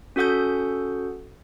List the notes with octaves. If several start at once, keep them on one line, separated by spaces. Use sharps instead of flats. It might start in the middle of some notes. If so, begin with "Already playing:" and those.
C#4 F#4 A4 F#5 D#6 G6